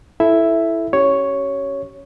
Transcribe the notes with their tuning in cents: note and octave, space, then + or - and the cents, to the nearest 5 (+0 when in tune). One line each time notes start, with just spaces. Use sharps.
E4 +5 A4 -10 E5 +0
C#4 +0 G4 -30 C#5 +0